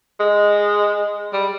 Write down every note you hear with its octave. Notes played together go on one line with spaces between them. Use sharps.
G#3
G3